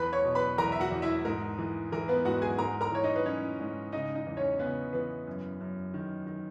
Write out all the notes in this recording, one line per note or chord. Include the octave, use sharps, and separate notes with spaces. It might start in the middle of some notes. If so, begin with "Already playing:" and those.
Already playing: E2 B4 B5
C#5 C#6
B2
B4 B5
E2 A#4 A#5
E5
F#4 F#5
E2
E4 E5
G#2 A#4
E3
E3 A#4
B3 B4
G#2 F#4 F#5
G#4 G#5
G#2 A#4 A#5
A#4 A#5
E3 C#5
D#4 D#5
B4
E3 C#4 C#5
G#2
C#3 D#4 D#5
D#4 D#5
E2
C#4 C#5
C#3 B3 B4
E3 B3 B4
F#2
F#2
D#3
D#3